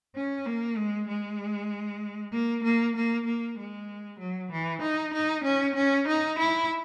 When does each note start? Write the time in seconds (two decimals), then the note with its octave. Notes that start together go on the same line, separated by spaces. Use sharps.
0.15 C#4
0.46 A#3
0.77 G#3
1.08 G#3
2.32 A#3
2.64 A#3
2.96 A#3
3.26 A#3
3.58 G#3
4.19 F#3
4.52 E3
4.82 D#4
5.14 D#4
5.44 C#4
5.75 C#4
6.08 D#4
6.38 E4